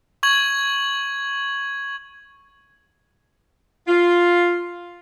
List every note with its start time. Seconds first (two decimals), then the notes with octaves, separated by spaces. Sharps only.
0.23 C#6 G#6 F#7
3.87 F4